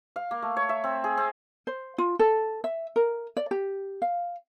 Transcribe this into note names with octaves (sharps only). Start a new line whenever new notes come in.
F5
A#3
A3
C#5
E5
C4
G#4
C4
C5
F4
A4
E5
A#4
D5
G4
F5